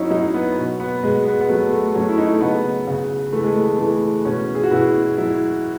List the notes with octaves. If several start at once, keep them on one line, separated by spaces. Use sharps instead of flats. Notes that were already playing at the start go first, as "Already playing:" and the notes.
Already playing: F#3 C#4 D#4 E4
F#3 D#4
B3
B2
B3
B2 G#3
B3
B3
F#3 A3
A3
F#3 C#4
E4
D#4
A3
C#3 B3
C#3
E3 A3
G#3
A3
E3 A3
B2 C#4
G#4
F#4
B2 E4
F#3 E4